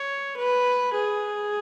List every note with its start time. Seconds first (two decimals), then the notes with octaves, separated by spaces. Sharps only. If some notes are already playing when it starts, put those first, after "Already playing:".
Already playing: C#5
0.37 B4
0.95 G#4